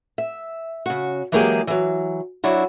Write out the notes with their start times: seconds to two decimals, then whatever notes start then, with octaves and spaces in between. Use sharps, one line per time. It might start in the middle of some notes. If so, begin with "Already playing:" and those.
0.18 E5
0.86 C#3 F#4
1.32 E3 F#3 G#3 A#3 G4 G#4
1.67 E3 F#3
2.44 F#3 D4 E4 F#4